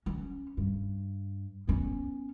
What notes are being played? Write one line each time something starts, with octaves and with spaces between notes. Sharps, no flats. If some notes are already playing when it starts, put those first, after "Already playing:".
C#4
G2
B3 C#4